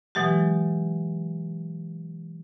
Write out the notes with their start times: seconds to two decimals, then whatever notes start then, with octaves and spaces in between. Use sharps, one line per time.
0.15 B2 E3 F#3 G#3 G4